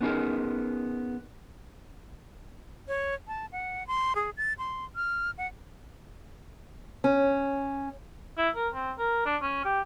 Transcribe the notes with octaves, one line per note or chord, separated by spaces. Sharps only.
B3 C#4 D#4 F4 G#4 A#4
C#5
A5
F#5
C6
G#4
A6
C6
F6
F#5
C#4
E4
A#4
C4
A#4
D4
C#4
G4